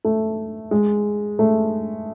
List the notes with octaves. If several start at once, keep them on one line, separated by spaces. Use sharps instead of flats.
A3
G#3
A3